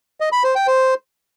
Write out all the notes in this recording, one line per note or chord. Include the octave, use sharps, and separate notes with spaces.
D#5
B5
C5
G5
C5